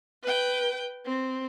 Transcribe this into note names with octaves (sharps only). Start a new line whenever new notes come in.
B4 G5
C4